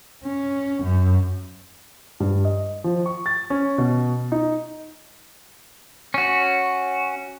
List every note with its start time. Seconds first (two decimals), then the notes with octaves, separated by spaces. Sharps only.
0.24 C#4
0.83 F#2
2.20 G2
2.45 D#5
2.84 F3
3.06 C#6
3.26 A6
3.50 C#4
3.78 B2
4.32 D#4
6.14 C#4 F#4